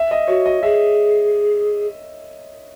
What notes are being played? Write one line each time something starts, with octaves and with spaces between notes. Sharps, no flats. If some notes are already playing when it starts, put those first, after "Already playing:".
Already playing: E5
D#5
F#4 C#5
D#5
G#4 E5